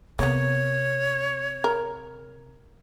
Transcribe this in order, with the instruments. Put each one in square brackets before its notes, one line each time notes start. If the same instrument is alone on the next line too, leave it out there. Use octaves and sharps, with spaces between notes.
[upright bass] C3 [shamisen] A#3 B3 [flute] C#5
[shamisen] A#4